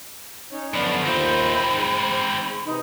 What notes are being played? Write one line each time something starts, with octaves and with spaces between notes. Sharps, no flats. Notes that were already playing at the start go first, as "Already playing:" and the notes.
C#4 D#4 C#5
F#2 D3 F3 B3 D5 B5
D#2 C4 D#4 F4 C5 E5
G#3
C3 E3 D#4